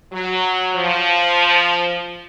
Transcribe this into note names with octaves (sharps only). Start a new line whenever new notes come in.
F#3
F3